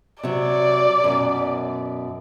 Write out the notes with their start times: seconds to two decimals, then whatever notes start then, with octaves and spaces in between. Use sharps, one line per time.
0.23 C3 F#3 D5
1.04 F#2 B2